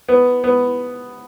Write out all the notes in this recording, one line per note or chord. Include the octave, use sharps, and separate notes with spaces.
B3
B3